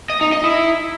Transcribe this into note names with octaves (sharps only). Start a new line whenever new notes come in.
D#5
D#4
D#5
E4